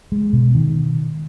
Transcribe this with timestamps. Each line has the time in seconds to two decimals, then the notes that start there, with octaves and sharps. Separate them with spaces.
0.12 G#3
0.33 B2
0.55 D#3